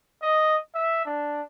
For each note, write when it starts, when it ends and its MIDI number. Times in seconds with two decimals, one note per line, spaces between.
0.22 0.56 75
0.74 1.04 76
1.05 1.41 62